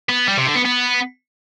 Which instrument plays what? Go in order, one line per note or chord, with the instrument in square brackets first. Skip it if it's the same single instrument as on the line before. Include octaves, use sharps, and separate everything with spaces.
[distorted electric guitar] B3
G3
C3
D3
B3
B3